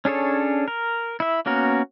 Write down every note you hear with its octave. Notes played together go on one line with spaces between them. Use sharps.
C#4 D4 G#4 A4 C#5
A#4
E4 E5
A#3 B3 C#4 F#4 A#4